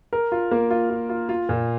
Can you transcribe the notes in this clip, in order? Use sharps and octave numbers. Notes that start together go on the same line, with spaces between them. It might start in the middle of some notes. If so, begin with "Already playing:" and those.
A#4
F4
A#3
F4
F4
F4
F4
A#2